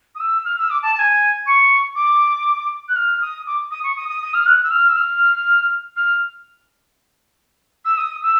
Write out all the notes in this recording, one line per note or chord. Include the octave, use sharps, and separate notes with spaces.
D#6
E6
F6
E6
D6
A5
A5
G#5
C#6
D6
F#6
F6
D#6
D6
D#6
C#6
D#6
D#6
D#6
F6
F#6
E6
F6
E6
F6
F6
E6
D#6
E6